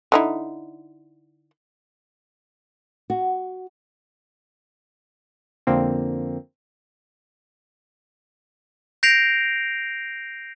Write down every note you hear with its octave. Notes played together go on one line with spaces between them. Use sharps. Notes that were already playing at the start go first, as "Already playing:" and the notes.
D3 D#4 E4
F#4
F2 D3 F3 A#3 C4
G6 A#6 C7 D7 F7